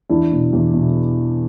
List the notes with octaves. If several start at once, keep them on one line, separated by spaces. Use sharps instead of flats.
E2 D4 E4
B2
E2
B2